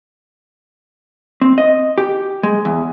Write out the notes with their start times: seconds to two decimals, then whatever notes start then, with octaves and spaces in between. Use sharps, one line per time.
1.41 C4
1.58 D#5
1.98 G4
2.43 G#3
2.65 E2